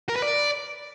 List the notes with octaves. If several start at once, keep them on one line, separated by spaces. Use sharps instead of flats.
A#4
B4
D5